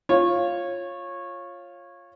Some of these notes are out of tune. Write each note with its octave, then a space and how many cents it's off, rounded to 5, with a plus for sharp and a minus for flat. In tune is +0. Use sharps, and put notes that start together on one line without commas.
F4 +0 C#5 -20